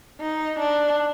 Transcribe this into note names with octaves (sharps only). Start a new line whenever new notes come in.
D#4
D4